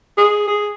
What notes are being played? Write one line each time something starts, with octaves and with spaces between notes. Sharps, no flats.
G#4
G#4